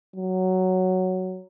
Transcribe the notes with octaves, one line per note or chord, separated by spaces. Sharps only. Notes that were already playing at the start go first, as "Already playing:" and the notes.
F#3